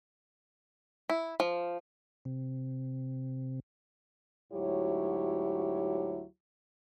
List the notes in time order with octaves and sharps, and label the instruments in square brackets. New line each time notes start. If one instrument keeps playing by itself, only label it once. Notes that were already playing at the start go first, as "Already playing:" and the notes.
[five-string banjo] E4
F3
[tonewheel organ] C3
[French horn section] D2 G#2 F#3 E4 G4 C#5